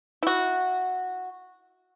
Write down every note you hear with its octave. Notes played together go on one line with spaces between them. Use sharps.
E4 F#4